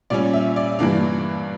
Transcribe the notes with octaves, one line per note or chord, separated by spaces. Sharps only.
A#2 G3 C#4 D5
E5
D5
G2 E3 A#3 D4